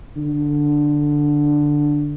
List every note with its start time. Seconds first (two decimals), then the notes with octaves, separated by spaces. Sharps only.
0.17 D3